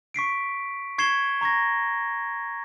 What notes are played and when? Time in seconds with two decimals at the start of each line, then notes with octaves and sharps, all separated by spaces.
0.14 C#6 B6 C7 D7
0.98 C#6 G#6 C7 C#7 E7 G7
1.41 A#5 C#6 G#6 A#6